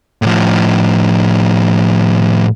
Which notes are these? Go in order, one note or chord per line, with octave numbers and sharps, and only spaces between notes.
A2 F3